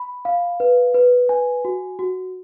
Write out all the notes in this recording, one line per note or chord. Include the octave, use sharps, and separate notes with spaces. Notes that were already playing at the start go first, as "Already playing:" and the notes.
Already playing: B5
F5
B4
B4
G#5
F#4
F#4